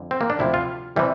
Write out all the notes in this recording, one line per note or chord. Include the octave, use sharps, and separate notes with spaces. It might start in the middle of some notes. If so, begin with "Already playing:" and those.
Already playing: F2 D3
C4
A#3
D4
D2 C3 F3 E4
F4
C3 E3 G3